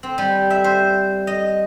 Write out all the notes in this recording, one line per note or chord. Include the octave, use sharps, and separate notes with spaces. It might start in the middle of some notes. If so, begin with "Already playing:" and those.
C4
G3
E5
C5
D#5